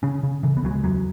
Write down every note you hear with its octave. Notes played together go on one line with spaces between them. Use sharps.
C#3 C#4
C#3
C#3 E3
B3
C#2 F#3
G#3
E2 F#3